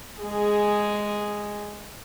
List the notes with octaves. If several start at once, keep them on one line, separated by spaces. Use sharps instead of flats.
G#3 G#4